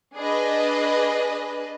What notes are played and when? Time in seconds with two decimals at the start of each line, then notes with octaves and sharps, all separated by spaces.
0.16 D4 G#4 B4 D#5